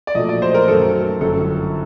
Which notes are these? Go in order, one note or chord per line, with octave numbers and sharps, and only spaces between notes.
D5
A#1 A#2 F#3 A3 D#5
D5
C5
A#4
F#2 D#3 F#3 A3 A4
G1 F#2 D#3 A4